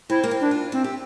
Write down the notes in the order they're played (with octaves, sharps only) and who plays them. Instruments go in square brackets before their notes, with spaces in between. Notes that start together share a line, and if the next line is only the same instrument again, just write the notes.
[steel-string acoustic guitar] C4 [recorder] E4
[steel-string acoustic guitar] A#3
C4
[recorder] D4
[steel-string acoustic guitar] F4
[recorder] C4 [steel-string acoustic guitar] E4
[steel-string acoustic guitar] G4